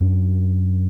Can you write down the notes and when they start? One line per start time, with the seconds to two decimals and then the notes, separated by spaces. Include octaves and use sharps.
0.01 F#2 D4